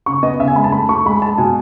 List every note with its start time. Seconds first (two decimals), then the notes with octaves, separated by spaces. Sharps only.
0.06 C#3 C#6
0.23 B3 D#5
0.39 C#3 E5
0.48 G#5
0.55 G#3 B5
0.64 A5
0.72 A3 B5
0.89 A3 C#6
1.06 G#3 B5
1.22 G#3 A5
1.38 B2 G#5